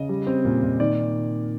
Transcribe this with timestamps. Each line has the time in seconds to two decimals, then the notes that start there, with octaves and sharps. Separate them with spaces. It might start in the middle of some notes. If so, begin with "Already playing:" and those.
Already playing: C#3 D#5
0.09 G3
0.27 C4
0.45 A#2
0.63 A#2
0.80 D#3 D5